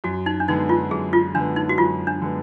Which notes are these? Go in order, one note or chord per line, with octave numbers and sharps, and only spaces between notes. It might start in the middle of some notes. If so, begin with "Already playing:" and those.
F#2 F#4
D#4
D4
D3 G#3 B3 D#4
F4
F#2 G#4
F4
D3 G#3 B3 D4
D#4
F#4
F#2 F4
D4
D3 G#3 B3